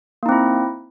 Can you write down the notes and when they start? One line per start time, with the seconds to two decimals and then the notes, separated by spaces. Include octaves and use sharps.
0.23 A#3
0.26 D#4
0.29 C4
0.32 E4